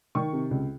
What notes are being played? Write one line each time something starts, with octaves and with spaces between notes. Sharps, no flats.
D#3 C#6
C3
C#2